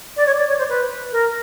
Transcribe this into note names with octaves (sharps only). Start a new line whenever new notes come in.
D5
C#5
D5
C#5
C5
B4
A#4